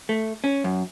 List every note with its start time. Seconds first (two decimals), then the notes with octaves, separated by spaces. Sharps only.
0.09 A3
0.44 C#4
0.64 F#2